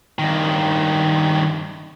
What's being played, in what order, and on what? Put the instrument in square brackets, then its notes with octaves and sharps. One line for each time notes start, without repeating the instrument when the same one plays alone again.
[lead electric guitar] G2 D#3